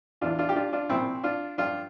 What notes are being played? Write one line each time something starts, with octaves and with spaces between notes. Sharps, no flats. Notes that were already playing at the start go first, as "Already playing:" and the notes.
E2 E3 D4 F4
D4 F4
G4
D4 F4
D4 F4
C2 A#2 F3 C4 E4
D4 F4
G2 F3 D4 F4